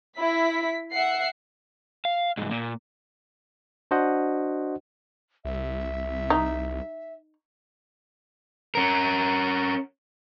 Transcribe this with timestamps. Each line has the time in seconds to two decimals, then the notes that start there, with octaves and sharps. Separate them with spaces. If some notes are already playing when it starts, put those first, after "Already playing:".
0.17 E4 B6
0.93 E5 F#5 C7
2.05 F5
2.37 C2 G#2
2.51 A#2 A#3
3.91 D4 F#4 C5 D#5 F#5
5.45 C2 E5
6.30 D#4
8.75 C#4 A#4